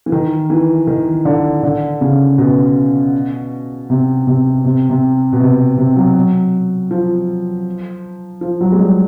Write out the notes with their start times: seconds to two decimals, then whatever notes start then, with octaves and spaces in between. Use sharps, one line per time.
0.06 E3
0.12 D#3
0.50 E3
0.87 D#3
1.25 D3
1.63 D3
2.01 C#3
2.38 B2
3.90 C3
4.27 C3
4.65 C3
4.90 C3
5.33 B2
5.40 C3
5.77 C3
5.96 F#3
6.91 F3
8.41 F3
8.61 F#3
8.72 G#3
8.79 G3